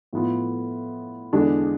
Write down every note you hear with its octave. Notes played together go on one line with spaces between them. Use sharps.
A2 F3 B3 F4
E2 D3 G#3 D4